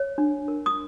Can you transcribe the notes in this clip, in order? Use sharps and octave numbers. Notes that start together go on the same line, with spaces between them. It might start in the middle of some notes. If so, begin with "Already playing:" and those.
Already playing: C#5
D4
A#4
D#6